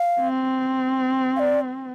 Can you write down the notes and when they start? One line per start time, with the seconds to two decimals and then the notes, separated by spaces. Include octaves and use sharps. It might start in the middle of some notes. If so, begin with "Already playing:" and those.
Already playing: F5
0.20 C4
1.36 F5
1.40 D5